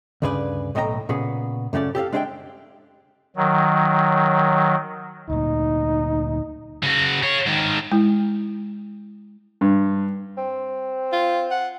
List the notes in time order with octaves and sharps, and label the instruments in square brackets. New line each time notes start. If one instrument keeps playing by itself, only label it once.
[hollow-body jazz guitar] D2 G2 C#3 G#4 B4 D5
B1 A2 D#5 G5 G#5 A#5
A#2 C#3 B3 G#4
F#2 C#3 A3 C#4 D5
G4 A4 D5 F5
G#3 D4 G#4 C5 E5 G5
[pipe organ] D#3 F#3
[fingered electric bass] D2 A#2 [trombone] D#4
[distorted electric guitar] C#3 F#4
G#4 C#5
G#2 D#3
[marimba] G#3 E4
[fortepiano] G2
[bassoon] C4
[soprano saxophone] F4
F#5